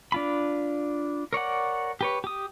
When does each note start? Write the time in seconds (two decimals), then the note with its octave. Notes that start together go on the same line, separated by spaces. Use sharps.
0.12 D4 F4 B5
1.33 A#4 C#5 D5 F#5
2.01 G4 B4 C#5
2.24 G4 D#6